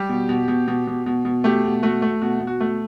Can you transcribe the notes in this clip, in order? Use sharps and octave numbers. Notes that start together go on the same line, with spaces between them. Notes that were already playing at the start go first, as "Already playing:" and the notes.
Already playing: G3 G4
B2
B2
B2
B2
B2
B2
B2
A3 G4
B2
A3 F#4
A3
B2 F#4
B2
F#4
A3